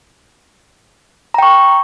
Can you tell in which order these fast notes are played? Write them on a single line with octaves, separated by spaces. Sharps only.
A#5 G5 C#6